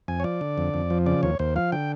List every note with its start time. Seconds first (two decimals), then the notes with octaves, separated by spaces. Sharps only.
0.08 F2 G#5
0.20 C#5
0.24 F3 D5
0.41 D3
0.58 F2
0.74 F2
0.90 F3
1.06 C#3 D5
1.23 D#2 C#5
1.39 D#2 C5
1.56 F3 F5
1.72 D3 G5